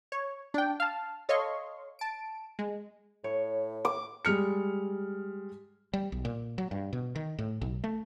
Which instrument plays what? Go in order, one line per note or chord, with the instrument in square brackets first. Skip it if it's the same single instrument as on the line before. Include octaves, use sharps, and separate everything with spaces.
[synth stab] C#5
D4 G5
F5 A5
A4 C#5 D#5 F5 C6 C#6
A5 D7
G#3
[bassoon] A2 [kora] C#5
[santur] D6
[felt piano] G3 G#3 F6 C#7
[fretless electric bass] G3
B1
A#2
F#3
G2
B2
D#3
A2
B1
A3